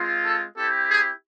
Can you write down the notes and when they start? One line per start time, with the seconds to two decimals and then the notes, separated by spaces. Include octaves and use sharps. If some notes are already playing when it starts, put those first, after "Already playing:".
Already playing: G#3 C4 F4
0.24 A4
0.57 C4 E4 G4 A4
0.90 G#4